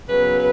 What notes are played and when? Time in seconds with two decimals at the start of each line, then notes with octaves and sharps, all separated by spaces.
0.08 C#3 F#3 B3 B4
0.37 B4